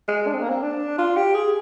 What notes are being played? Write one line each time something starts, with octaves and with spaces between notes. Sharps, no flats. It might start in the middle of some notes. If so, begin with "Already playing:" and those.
G#3
D4
C4
A#3
C4
D4
F4
G4
G#4